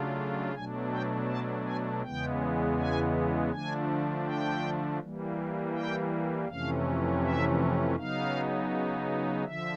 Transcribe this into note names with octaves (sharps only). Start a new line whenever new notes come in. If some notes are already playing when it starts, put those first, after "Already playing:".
Already playing: C#3 F#3 A3 D4 F4
B2 F#3 A3 D4 G#5
G5
A5
G#5
E2 C#3 E3 G#3 B3 G5
G#5
D3 F3 A3 D4 G#5
G5
E3 G3 A#3
G5
F2 C3 E3 A3 C#4 F5
E5
C#3 F#3 B3 D#4 F5
D3 F3 E5